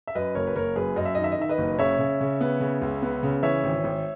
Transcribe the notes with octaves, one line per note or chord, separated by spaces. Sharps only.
E5
F#2 B4 D#5
F#1 A#4 C#5
B4
F#1 A#4 C#5
F#2 G#4 B4
F#2 D#5
E5
D#3 D#5
E5
D#5
D#3 E5
B4 D#5
F#1
C#3 C#5 E5
C#3
C#3
B3
C#3
C#2
B3
C#3
E3 C#5 E5
G#1
G#1